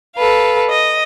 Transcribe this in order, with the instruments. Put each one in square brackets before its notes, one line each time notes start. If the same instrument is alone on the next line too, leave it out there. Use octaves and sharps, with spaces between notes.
[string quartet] A4 B4 F5
D#5